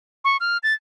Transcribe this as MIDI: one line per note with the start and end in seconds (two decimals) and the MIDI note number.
0.24 0.37 85
0.40 0.57 89
0.63 0.74 93